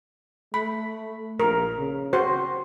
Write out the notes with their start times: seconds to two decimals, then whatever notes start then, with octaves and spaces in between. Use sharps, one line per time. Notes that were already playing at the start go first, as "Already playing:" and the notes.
0.54 A3 B5
1.40 A#1 A#4
1.78 C#3
2.13 F#4 C5